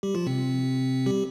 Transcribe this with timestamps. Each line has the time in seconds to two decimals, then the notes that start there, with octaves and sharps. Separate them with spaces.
0.03 G3 G4
0.15 F3 F4
0.27 C3 C4
1.06 G3 G4